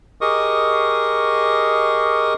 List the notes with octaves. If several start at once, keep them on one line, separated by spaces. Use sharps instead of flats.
G4 G#4 A#4 D#5 C#6 D#6